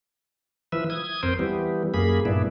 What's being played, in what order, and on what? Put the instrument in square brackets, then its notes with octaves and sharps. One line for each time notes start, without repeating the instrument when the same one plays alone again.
[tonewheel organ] E3 F3 B4 E5
D#6 G#6
F2 C4 A#4 C5 G5
E3 G3 B3
F#2 A#3 G#4 B5
G2 A#2 B3 D4 E4